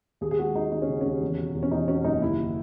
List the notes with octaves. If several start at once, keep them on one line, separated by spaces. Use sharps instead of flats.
D#2 G#4
G#4
G#3 F#4
D#2 D#4
D#2 D#4
C#4
C#3
D#2 C#4
E2
B2
E2
C#4
E2 D#4
B2 C#4
F#1 D#4
D#2 E4